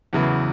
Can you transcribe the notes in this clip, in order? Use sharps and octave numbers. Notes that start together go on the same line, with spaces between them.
E2 C#3 F#3 B3 E4